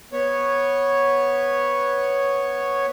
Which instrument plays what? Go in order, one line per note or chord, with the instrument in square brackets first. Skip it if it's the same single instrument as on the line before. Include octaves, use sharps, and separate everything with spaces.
[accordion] B3 C#5